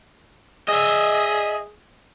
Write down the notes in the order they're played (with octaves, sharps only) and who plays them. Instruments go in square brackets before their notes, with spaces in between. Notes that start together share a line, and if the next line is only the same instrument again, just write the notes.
[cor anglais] G#4 [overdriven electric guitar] D#5 E5